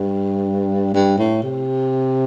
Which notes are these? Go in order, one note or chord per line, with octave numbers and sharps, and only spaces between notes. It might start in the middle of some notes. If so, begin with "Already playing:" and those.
Already playing: G2
G2
A2
C3